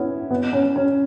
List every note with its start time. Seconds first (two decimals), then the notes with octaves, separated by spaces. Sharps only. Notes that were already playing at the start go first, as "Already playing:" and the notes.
Already playing: B3 C#4 E4
0.31 B3
0.53 C#4
0.76 C#4